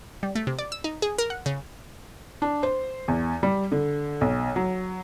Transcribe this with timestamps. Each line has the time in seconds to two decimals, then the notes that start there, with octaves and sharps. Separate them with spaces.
0.23 G3
0.35 A3
0.47 C3
0.59 D5
0.72 E6
0.84 D#4
1.02 G#4
1.18 A#4
1.30 F#5
1.46 C#3
2.42 D4
2.63 C5
3.08 E2
3.43 G3
3.72 D3
4.21 B1
4.56 F#3